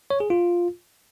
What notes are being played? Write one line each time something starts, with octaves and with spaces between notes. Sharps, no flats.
C#5
G#4
F4